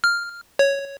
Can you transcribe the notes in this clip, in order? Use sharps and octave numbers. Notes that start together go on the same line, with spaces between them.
F6
C#5